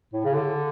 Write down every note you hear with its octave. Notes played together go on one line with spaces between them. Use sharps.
A2
C#3
D3